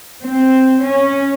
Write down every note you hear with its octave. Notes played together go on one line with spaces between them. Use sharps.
C4
C#4